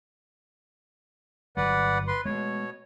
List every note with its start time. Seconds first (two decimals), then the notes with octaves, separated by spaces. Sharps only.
1.57 G1 F#3 B4 D5 F#5
2.08 B4 C6
2.25 B2 G#3 A3 B3 C#5